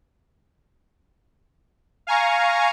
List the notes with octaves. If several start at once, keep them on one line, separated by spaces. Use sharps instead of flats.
F5 G#5 A#5 C#6